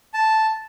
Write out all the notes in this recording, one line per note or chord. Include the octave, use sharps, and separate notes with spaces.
A5